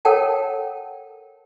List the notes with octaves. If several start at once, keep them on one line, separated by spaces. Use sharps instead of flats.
A4 A#4 C#5 F#5 G5 A5